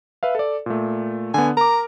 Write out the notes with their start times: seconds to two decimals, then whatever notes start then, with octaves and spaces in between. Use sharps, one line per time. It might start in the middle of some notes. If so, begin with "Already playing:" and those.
0.23 B4 E5 F5
0.35 A4 D5
0.66 A#2 A3
1.34 D3 B3 G#5
1.57 A#4 A#5 D6